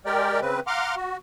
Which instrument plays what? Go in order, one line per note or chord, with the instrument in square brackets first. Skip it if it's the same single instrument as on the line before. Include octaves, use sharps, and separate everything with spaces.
[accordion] G#3 G4 A#4 D5 G5
C#3 C4 B4
F5 F#5 A#5 C6 D6 F6
F#4